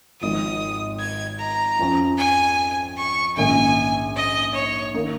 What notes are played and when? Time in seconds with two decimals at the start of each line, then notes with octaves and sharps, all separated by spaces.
0.21 G#1 G#2 F3 D#6
1.00 G#6
1.39 A#5
1.79 F2 F3 C#4
2.18 G#5
2.98 C#6
3.37 A#1 G#2 D#3 A#3 C#4 G#5
4.16 D#5
4.55 C#5
4.95 D#3 A#3 D#4